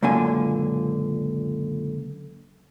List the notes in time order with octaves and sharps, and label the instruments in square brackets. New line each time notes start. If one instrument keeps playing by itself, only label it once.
[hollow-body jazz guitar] C#2 F#2 A#2 D3 G#5